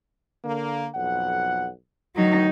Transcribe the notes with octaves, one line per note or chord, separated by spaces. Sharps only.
D3 A#3
B1 F2 F#5
D2 D#3 F#3 D#4